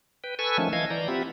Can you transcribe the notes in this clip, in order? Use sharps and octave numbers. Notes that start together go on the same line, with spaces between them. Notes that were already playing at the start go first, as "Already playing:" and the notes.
B4 G5
A4 B4 G#5 C#6 E6
D#3 F3 A3 C#4
E3 D#5 F5 G#6
E3 D5 A#5 G6
C4 F4 G4 E5 F#5 B5